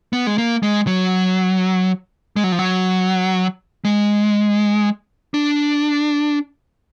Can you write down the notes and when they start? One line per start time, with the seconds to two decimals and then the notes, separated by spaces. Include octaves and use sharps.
0.13 B3
0.27 G#3
0.38 A#3
0.63 G#3
0.87 F#3
2.36 G#3
2.44 F#3
2.52 F3
2.59 F#3
3.85 G#3
5.34 D4